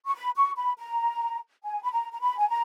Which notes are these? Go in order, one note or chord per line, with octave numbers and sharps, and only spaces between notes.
C#6
B5
C#6
B5
A#5
G#5
B5
A#5
A#5
B5
G#5
A#5